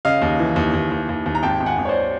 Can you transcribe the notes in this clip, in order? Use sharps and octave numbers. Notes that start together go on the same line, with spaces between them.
C#3 D#5 F5
D#2
E3
D#2
D#2
D#2
D#2
D#2
A#5
G#1 G5 A5
G#1
F#5 G#5
G#1
C#5
C5 D5